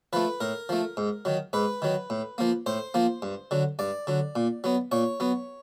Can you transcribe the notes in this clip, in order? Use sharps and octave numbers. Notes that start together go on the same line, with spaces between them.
F3 A3 B4
A2 A#4
F3 A3
G#2
D#3 F#3
G#2 B4
D#3 F#3
A2
F3 A#3
A2 C5
F3 A#3
G2
D3 F#3
G2 D5
D3 F#3
A#2
F#3 B3
A#2 C#5
F#3 B3